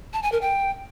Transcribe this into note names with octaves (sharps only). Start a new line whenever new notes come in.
A5
G#5
A#4
G5